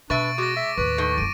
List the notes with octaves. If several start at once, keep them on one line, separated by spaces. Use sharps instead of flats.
B2 D4 B4 E5 C#6 A6 D7
G#3 F#4 D6 A#6
E5
D#2 A2 B4 C#6
D#3 A3
F#1 C4 D7 D#7